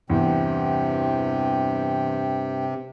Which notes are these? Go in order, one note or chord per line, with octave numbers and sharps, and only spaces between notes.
E2 G2 C3 G5